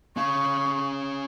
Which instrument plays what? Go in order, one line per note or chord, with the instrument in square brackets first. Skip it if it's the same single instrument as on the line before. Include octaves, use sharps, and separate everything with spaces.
[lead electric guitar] C#4 F5 [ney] C#6